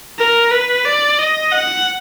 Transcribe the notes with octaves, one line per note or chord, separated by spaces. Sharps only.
A#4
B4
D5
D#5
F#5